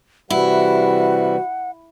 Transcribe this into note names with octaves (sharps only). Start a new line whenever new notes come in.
C3 E3 G3 E4 F#4 F#5